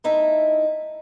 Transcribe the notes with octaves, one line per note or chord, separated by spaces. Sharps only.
A3 D#4 E4 E5